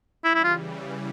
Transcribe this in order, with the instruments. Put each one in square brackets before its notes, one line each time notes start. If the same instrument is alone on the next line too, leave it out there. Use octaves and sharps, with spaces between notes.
[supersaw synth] C#3 E3 G3 [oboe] E4
[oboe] E4
F4